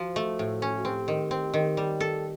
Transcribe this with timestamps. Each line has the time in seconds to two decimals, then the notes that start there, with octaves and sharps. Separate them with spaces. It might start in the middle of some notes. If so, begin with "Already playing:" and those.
Already playing: F3 F#4
0.16 A3
0.39 A2
0.62 C#4
0.77 F#4
0.85 C4 G4
1.08 D#3
1.31 C4
1.54 D#3
1.77 G3
2.00 A4